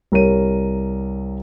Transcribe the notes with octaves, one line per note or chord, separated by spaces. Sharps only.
C2 A#4 C#5 D#7